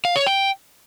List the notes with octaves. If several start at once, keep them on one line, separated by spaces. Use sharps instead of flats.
F5
C#5
G5